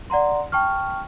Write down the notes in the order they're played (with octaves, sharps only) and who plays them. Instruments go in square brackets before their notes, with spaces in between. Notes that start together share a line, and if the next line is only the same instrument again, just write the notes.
[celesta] D5 F#5 A#5 C6
G5 A5 C#6 F6